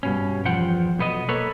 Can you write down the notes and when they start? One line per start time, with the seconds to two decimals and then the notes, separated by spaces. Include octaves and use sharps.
0.03 G2 B2 C#4
0.45 E2 F3 F4 C5 F#5 G5
0.99 B1 B3 D#5
1.28 A#3 A4 B4 C#5